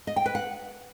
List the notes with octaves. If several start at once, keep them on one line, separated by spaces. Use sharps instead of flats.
D#5
G5
B4
F#5